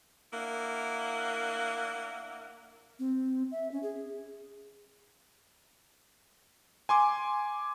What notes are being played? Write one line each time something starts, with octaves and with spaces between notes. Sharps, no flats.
A#3 D4 E4 A#4 F#5
C4
E5
C#4
G#4
G#5 C6 D6